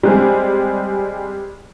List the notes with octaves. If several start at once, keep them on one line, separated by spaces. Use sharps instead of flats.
G3 G#3 C4